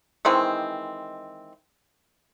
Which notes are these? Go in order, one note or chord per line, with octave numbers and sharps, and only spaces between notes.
D#3 E3 G#3 C4